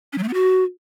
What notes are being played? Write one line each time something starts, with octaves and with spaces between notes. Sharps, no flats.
C#4
F#3
A3
B3
F#4